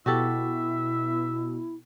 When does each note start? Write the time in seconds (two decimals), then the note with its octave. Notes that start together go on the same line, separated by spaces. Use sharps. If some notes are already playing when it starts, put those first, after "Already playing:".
0.06 B2 E4 F#4 G4 A4 E5